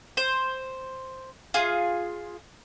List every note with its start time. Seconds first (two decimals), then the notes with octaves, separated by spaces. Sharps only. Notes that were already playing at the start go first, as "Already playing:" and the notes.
0.17 C5
1.54 F4 G#4